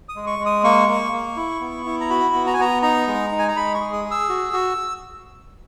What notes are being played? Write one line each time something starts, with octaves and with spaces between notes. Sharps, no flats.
D#6
G#3
C#6
G#3
D#6
A#3 C#6
A#3
A#3
E4
B3
E4
A#5
F#4 B5
B3
A#5
G#5
B3 A#5
D#4 A#5
G#3
D#4
G#5
A#5
G#3 B5
C#6
G#4
D#6
G#4
E6
F#4
F#4